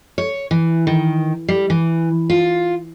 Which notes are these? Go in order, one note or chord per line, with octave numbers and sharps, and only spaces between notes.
C#5
E3
D#3
G3
E3
F4